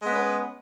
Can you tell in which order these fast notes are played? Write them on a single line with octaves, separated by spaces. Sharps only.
G#3 B3 C#4 B4